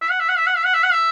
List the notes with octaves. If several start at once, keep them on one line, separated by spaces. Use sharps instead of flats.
E5
F#5
E5
F#5
E5
F#5
E5
F#5
E5
F#5
E5